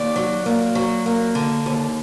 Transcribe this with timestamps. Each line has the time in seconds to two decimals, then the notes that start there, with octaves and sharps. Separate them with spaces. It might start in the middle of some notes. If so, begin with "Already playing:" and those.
Already playing: D#2 D5
0.16 F#3
0.46 A#3
0.75 F#3
1.06 A#3
1.35 D3
1.66 D#2